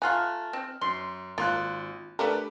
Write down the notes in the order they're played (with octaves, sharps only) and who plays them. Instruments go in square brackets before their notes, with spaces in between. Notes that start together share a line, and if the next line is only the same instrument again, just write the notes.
[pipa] A3 F4 F#5 [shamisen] G#5 [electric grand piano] A#5 F6 F#6
[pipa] C4
[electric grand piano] F#2 [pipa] C6
[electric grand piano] G#1 C6 F#6 [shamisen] A#3 [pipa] F4
[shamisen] A3 D4 A#4 [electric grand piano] G4 B4